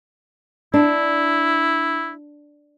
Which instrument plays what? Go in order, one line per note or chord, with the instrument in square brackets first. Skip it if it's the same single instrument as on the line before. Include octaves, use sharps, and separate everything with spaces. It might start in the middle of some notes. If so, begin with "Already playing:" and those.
[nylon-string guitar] D4 [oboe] E4